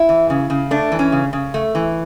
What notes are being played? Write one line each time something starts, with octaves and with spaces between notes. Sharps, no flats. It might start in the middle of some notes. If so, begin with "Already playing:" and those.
Already playing: E4
E3
C#3
C#3
A3 D4
E3
C#4
C#3
C#3
A3
E3